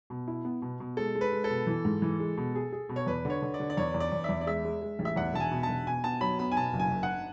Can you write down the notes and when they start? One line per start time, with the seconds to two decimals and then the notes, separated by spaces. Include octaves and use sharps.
0.10 B2
0.28 E4
0.45 B3
0.62 B2
0.80 B2
0.97 G#3 A4
1.15 G#3
1.21 B4
1.33 G#3
1.44 A4
1.50 B2
1.67 E3
1.85 G#2
2.02 E3
2.20 G#3
2.37 B2
2.55 G#4
2.72 G#4
2.89 B2
2.96 C#5
3.07 E2 B4
3.25 D3 C#5
3.42 D3
3.54 D5
3.60 D3
3.70 D5
3.77 E2 C#5
3.94 E2
4.00 D5
4.12 E2
4.24 E2 E5
4.41 D5
4.47 G#3 E5
4.65 G#3
4.82 G#3
4.99 A1
5.05 E5
5.16 E2 F#5
5.34 E1 A5
5.40 G#5
5.51 B2
5.63 A5
5.69 E1
5.87 B2 G#5
6.04 B3 A5
6.21 F#3 B5
6.39 B3 B5
6.52 G#5
6.57 B2 A5
6.74 F#1
6.80 G#5
6.91 F#1
7.03 F#5